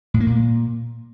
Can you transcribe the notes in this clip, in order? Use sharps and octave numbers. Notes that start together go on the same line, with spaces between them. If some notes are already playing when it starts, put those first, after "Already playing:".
A2
A#3
A#2